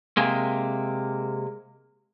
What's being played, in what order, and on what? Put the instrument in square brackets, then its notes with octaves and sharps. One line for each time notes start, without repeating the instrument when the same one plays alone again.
[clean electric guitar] C3 G#3 A#3